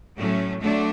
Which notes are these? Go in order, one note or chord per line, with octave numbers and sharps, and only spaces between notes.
A2 F#3 A3 C#4
D3 F#3 A3 D4